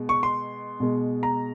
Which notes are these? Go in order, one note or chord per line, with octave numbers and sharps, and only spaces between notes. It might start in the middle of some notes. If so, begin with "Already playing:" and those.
Already playing: B2 G#3
C#6
C6
B2 G#3
A#5